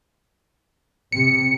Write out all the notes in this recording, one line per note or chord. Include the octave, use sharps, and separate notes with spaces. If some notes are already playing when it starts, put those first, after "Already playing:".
C3 C#7